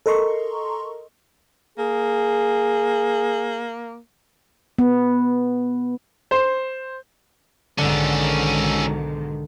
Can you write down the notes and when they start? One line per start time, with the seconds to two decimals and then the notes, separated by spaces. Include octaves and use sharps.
0.06 A4 A#4 D#5 A#5 C6 C#6
1.78 A#3 G#4
4.79 B3
6.31 C5
7.78 B1 G#2 D3 D#3 C#4 A4